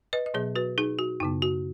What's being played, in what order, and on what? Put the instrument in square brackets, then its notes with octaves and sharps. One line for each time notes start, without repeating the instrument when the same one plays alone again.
[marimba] B4 D#5
D#5
B2 F#3 B3 G#4 C#5
F#4 B4
D#4 G#4
F#4
F#2 C#3 B3 D#4
F#4